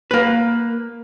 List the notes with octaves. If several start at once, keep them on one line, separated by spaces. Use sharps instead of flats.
A#3 B4